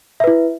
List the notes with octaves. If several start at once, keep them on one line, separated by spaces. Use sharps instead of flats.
E4 B4 E5